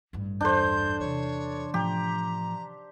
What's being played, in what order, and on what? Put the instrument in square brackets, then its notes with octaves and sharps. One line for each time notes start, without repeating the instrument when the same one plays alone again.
[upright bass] A1 G2
[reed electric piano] E2 A4 [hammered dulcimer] D4 C5 [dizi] G6
[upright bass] C3 E3 [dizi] C#5
[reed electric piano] A2 F3 [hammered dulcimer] G4 [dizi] A#5